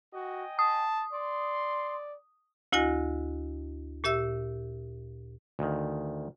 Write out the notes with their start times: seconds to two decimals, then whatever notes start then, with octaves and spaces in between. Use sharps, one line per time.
0.14 F#4 D#5 G5 G#5
0.59 A5 D#6
1.13 D5 C6
2.72 D2 E4 F#4 D#5 G#5 A#6
4.04 A#2 G4 E5 E6
5.59 D2 D#3